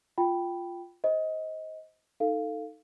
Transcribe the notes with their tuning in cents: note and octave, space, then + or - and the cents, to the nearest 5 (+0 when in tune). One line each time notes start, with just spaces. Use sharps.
F4 +0 G5 +0 B5 +0
C5 +0 D#5 +20
D#4 +0 A4 +15 F5 -5